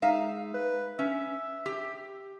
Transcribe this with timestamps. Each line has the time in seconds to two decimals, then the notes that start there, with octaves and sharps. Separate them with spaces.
0.02 G#3 D#4 E5 F5
0.54 B4
0.99 C#4 E5
1.66 G4